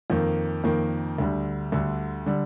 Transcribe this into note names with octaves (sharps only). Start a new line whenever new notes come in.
F2 D#3 A#3
F2 D#3 A#3
D2 D3 G3
D2 D3 G3
D3 G3